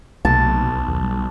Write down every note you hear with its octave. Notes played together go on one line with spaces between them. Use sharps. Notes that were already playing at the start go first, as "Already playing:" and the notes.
B1 C3 A3 A#3 A5
C2
D#2 D#3
G3